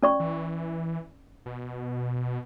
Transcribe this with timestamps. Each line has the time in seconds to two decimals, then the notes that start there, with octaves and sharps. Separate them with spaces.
0.03 C#4 D5 C#6
0.20 E3
1.46 B2